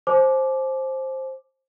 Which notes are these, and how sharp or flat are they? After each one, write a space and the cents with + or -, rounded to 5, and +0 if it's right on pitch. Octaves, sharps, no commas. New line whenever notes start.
C5 +15 A5 -45 D6 +0